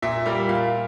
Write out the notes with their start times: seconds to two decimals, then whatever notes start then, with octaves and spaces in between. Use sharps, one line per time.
0.02 A#2 E5
0.25 G3 A#3
0.49 A#2 F5